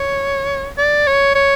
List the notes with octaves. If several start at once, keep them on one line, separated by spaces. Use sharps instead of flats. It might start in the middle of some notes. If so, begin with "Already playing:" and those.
Already playing: C#5
D5
C#5
C#5